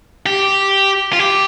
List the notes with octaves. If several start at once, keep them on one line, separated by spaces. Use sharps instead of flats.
G4
F4
G4